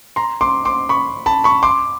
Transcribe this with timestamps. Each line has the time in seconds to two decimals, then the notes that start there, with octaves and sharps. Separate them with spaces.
0.16 A#5 C6
0.41 C6 D6
0.65 C6 D6
0.89 B5 C#6
1.26 A5 B5
1.44 B5 C#6
1.63 C6 D6